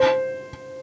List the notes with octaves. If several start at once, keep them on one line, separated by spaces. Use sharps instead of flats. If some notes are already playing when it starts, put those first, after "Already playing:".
Already playing: C5